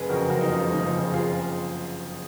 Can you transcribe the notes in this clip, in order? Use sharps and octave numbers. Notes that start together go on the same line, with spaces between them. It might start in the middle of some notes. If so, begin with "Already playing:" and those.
Already playing: F#1 G#4 B4
F2 C#3 F#4 A#4
F#1 F#4 A#4
D#4
F2 C#3 F4
F4
F#1 D#4
F4
F2 C#3
F4 G#4